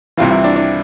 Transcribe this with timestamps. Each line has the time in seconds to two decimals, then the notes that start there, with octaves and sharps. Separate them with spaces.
0.17 C2 C3 E3 F4
0.31 E4
0.44 D4
0.56 D4